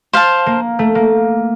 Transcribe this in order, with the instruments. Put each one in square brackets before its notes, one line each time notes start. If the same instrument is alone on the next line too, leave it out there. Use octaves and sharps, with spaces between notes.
[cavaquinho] C5 F5 A5
[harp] A#3
A3
A#3